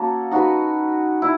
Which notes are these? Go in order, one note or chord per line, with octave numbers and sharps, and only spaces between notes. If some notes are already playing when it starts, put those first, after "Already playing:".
Already playing: A#3 C#4 F#4 A4
D#4 F#4 B4
E4